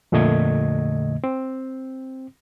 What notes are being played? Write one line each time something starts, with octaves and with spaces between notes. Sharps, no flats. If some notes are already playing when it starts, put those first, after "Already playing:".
F2 A#2 D3 A3 D#5 G#6
C4